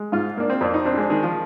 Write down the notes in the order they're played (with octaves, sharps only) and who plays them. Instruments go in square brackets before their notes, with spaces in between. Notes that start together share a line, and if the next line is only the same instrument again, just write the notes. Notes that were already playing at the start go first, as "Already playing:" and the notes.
Already playing: [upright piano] G#3
[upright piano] G#2 [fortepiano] F4
[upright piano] A#3 [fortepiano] D4
[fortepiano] C4
[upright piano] F2 [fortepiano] D4
[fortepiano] D#4
[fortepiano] C4 [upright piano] D4
[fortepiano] G#3
[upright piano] D#3 [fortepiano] G#3
[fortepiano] F3